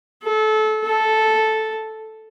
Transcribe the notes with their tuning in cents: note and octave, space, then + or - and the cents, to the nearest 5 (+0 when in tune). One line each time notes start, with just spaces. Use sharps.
A4 -25
A4 -5